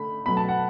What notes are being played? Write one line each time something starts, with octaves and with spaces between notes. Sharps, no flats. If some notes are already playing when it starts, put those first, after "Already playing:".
Already playing: D3 A3 B5
B2 F#3 A3 B5
A5
F#5